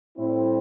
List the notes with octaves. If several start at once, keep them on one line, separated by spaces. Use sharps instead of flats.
A2 G3 C4 E4